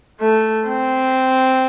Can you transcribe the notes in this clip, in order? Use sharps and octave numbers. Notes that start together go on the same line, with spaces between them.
A3
C4